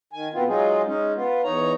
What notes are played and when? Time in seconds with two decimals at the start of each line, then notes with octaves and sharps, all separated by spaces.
0.13 D#3 G#5
0.34 B2 B3 C4 F4
0.48 F#3 G#3 D#4 F4 G#4
0.86 G#3 C#4 D#4
1.16 B3 F4
1.44 E2 D#4 C#5 A#5